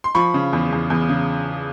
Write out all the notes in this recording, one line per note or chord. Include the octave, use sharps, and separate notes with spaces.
C6
F3 B5 C#6
C#3
E2
E2
E2
C#3